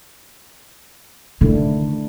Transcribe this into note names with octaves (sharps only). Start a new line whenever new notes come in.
D3 D#3 A3 D4 E4